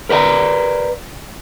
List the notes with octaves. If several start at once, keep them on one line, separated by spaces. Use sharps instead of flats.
A#4 B4 D5 G5 A#5